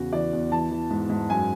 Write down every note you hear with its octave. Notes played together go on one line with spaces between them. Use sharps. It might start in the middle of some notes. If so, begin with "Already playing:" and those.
Already playing: E2 C#3 F#4
E3 D5
E2
E3 A5
E3
G#2
G#2
F#2 G#5